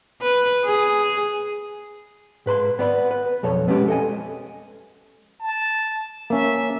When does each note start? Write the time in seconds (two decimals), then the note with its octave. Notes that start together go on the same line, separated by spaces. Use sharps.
0.22 B4
0.65 G#4
2.46 G#2 B4 B5 C6
2.79 B3 D5 B5
3.11 B4
3.43 B1 F2 A4 C#5
3.68 G#3 B3 C#4 G4
3.88 A4 D#5 G#5
5.40 A5
6.30 A#3 C#4 E5